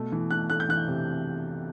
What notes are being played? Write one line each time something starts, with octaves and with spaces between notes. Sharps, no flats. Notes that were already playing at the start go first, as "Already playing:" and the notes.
Already playing: B2 A3
E3
A3 F#6
A3 F#6
G6
E3 F#6
C3